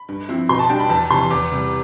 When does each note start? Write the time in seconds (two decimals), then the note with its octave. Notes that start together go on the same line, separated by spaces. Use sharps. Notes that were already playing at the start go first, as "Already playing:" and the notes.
Already playing: B5
0.09 G2
0.29 F3 C4 E4
0.49 B2 C6
0.59 A5
0.69 G3 D4 G5
0.79 B5
0.90 E2 A5
1.10 C3 E3 C6
1.31 E2 D6
1.51 C3 G3